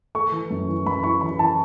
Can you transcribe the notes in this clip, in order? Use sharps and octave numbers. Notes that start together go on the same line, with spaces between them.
A3 C#6
E3
F#2
E3
F#2 B5
E4 C#6
E3 B5
E3 A5